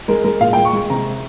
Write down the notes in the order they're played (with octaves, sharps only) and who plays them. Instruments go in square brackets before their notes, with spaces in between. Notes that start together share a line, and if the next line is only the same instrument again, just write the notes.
[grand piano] G#3 A#4
G#3 A#4
A#2 F5
G5
G#3
C#6
G#3
C3 A#5